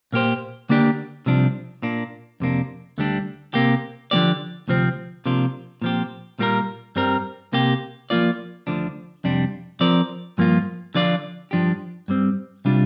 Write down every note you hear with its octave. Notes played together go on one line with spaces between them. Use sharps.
A#2 A#3 G4 C5
D3 A#3 D4 G4 D5
C2 C3 F3 D4
A#2 A#3 D4
F2 C3 A#3 D4
D2 D3 G3 D4
C3 A#3 G4
D3 F3 A#3 G4 D5
D2 C3 F3 C4
C3 F3 A#3 D4 F4
A#2 F3 C4 G4
A#2 G3 A#3 G4 A#4
G2 G3 C4 A#4
C3 A#3 G4
F3 A#3 F4 D5
D2 D3 F3 D4
F2 C3 G3 D4
F3 C4 A#4 D5
G2 F3 A#3 F4
D3 F3 D4 F4 D5
G2 F3 D4 G4
G2 G3 C4
C3 G3 D4 F4